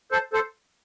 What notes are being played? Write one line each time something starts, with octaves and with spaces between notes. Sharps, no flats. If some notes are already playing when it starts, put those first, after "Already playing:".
A4 C5
A4 C5